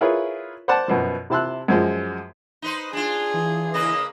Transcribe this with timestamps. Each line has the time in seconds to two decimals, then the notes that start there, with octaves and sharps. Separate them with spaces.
0.01 E4 F4 G#4 A#4 B4 C#5
0.68 C5 D5 F#5 A5
0.88 F#2 B2 F3
1.30 C3 E4 A5 C6 E6 F#6
1.68 F#2 F3 G#3
2.62 D#4 B4 C5
2.93 D4 F4 G#4
3.34 E3
3.74 C#3 A#3 B4 D#5